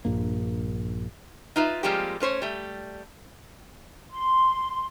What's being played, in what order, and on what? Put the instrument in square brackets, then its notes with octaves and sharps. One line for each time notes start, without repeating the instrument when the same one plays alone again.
[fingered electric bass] A#1 G2 A#3
[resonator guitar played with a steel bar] D#4 F4 B4 E5
F3 G3 G#3 A#3 C4 G4
A3 C#4 C5 C#5
G3 A3
[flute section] C6